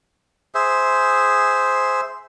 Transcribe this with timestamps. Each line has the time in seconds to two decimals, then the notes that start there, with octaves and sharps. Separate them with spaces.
0.55 G#4 C5 E5